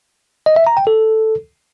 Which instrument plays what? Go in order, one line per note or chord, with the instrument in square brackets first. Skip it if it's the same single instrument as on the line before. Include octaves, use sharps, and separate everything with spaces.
[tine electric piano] D#5
E5
A#5
G5
A4